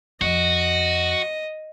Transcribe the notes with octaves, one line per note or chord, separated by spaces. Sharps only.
F2 F#4 D#5